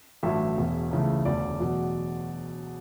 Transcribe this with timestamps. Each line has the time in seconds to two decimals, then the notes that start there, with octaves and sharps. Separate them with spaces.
0.23 A1 G2 F#3 A3 E5
0.57 E1 E2 B2
0.91 C#2 C#3 E3 A3
1.25 E1 D2 D3 D5
1.60 E2 B2 F#3 A3